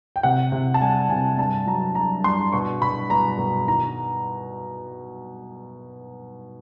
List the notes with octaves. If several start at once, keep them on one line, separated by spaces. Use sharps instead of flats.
G5
C3 F#5
C3
A5
G3 G#5
C3 G#5
G2 A5
F#3 A#5
F#3 A#5
G2 C6
B2 C#6
B2 B5
B2 A#5
B2
D#3 A#5